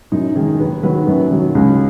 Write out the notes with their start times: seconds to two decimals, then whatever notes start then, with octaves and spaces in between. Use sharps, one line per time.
0.12 F#2 D#4
0.36 D#3 G#3 G#4
0.59 D#2 B4
0.83 D#3 F#3 B4
1.07 F#2
1.31 D#3 F#3
1.55 C#2